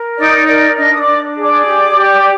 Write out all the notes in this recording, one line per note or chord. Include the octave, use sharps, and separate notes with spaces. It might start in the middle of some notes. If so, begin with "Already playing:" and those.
Already playing: A#4
D#4 D5
A#4 D5
D4 D#5
D#6
D5 D6
D4
G#4
D5 D6
G4
G4